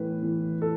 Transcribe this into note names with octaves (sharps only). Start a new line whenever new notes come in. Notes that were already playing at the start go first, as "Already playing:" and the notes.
Already playing: A2 E3 B4
E3
A4